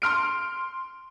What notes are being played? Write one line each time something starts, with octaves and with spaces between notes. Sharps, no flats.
C6 F6 D7